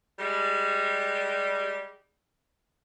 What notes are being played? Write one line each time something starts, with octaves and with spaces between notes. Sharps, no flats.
G3 G#3